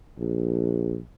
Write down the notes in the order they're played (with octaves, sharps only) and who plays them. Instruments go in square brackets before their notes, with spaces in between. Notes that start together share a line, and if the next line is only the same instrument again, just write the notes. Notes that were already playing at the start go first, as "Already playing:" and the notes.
[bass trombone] A#1